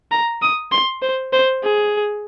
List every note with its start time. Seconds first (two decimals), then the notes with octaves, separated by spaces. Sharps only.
0.12 A#5
0.42 D#6
0.72 C6
1.02 C5
1.33 C5
1.63 G#4